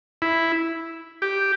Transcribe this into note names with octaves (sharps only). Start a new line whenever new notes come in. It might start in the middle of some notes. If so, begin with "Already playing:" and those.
E4
G4